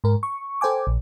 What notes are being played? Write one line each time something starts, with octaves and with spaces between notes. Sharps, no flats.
G#2 A#4
C#6
A4 C5 G5 G#5 D6
A#1